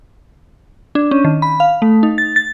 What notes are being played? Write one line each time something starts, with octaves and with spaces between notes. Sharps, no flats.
D4
C#4
D#3
B5
F5
A3
D#4
A6
A6